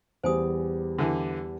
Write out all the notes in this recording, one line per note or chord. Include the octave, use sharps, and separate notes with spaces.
E2 G3 C5 G#5 D#6
D3 E3